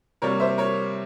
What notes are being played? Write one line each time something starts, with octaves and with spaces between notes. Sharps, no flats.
C3 G3 A#3 A#4 C#5
C5 E5
A#4 C#5